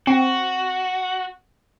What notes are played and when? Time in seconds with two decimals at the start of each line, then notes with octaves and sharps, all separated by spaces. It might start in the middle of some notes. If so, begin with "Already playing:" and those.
0.07 C4 F#4